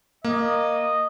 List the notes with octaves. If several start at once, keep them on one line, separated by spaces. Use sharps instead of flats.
A#3 D#5